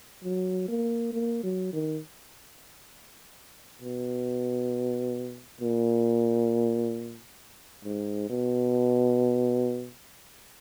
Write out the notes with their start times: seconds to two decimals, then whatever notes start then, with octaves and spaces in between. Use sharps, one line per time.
0.24 F#3
0.68 A#3
1.13 A#3
1.43 F#3
1.73 D#3
3.82 B2
5.61 A#2
7.85 G#2
8.30 B2